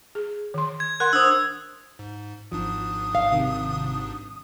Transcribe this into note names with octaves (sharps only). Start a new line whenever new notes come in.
G#4
D#3 C6
G#6
A#4 F#5 C6 F#6
D4 C5 D#6 E6
G#2
G#1 G#2 F3 D4 D#6
F5
C3 D#3 G3